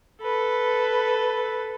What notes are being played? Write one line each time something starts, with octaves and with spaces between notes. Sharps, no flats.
A4 B4